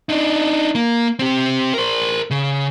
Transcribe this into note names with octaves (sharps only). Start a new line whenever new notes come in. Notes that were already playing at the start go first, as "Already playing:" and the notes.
D4 D#4
A#3
C4 G4
A#4 C5
C#3